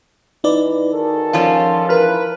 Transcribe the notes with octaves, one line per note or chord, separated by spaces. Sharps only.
E3 D#4 D5
D#3 F#4 G#4 A4
F3 C#4 F4
E3 A#4 B4 B5 F6